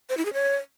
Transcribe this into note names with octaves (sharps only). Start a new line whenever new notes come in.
C5
E4
G#4
C#5